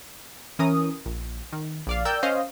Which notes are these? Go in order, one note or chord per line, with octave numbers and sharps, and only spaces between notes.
E3 C#4 A#4 D#6
A#1
D#3
A#1 D5 F5
A#4 D5 G5 E6 G6
C#4 C5 D#5 F5